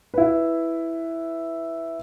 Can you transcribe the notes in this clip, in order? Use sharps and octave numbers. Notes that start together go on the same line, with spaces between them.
E4 B4